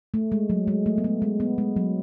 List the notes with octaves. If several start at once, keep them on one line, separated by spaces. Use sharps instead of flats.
A3
G#3
F#3
G#3
A3
B3
A3
G#3
B3
G#3
F#3